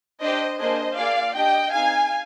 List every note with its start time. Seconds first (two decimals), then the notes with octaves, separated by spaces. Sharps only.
0.21 D4 G4 C5 D#5
0.59 A#3 D4 G#4 C5 D#5
0.98 A#3 F4 G#4 D5 F5
1.35 D4 G4 D#5 G5
1.73 C4 D#4 G#4 F5 G#5